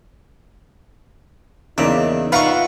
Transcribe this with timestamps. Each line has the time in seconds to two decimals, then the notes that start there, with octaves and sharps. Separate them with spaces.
1.78 E2 C#3 A#3 D4 D#4 E5
2.32 F4 B4 E5 F#5 A#5 C#6